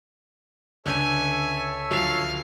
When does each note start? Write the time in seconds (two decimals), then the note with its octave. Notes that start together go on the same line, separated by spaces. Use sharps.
0.86 C#2 D3 A4 C#5 E5 G#5 G6 G#6
1.91 D2 F3 F#3 F5